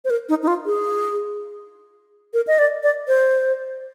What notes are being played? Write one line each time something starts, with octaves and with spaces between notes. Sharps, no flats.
C5
A#4
D#4
D#4
F4
G#4
A#4
D#5
D5
D5
C5